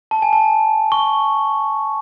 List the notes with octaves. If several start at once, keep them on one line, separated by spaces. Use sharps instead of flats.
A5
G#5
A5
C#6